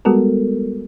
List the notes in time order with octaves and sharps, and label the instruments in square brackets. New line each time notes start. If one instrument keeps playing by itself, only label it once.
[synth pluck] G3 G#3 B3 F#4 A4 A#4